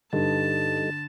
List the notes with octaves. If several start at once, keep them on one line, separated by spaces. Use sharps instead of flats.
G2 D3 G3 D#4 A4 A5